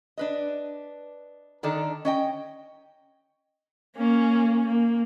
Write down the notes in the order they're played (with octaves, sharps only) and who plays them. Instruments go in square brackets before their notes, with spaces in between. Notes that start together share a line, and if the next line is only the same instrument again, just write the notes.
[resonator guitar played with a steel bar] D4 B4 D#5
D3 D#3 D4 D#4 A4
C#4 D#5 G5
[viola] A#3 C#4
A#3